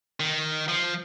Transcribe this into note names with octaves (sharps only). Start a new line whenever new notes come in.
D#3
F3